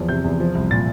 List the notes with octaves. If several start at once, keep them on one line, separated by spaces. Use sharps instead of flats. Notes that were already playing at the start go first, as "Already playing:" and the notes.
Already playing: E2 F3
C3 G6
E2
F3
C2
A#2 A6